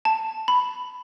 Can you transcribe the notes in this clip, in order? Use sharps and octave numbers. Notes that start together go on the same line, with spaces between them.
A5
B5